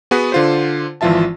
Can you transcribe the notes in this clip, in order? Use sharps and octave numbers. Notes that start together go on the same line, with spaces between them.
B3 F#4 G#4 B4
D3 F4 C5
G#1 E3 F3 F4 E5 A5